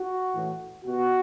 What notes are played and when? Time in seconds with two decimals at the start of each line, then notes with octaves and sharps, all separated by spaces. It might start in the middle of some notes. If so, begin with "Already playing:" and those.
Already playing: F#4
0.32 A2 E3
0.84 B2 F#4